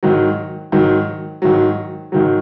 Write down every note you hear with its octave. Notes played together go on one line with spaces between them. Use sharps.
G#2 D#3 F#3
G#2 D#3 F#3
G#2 D#3 F#3
G#2 D#3 F#3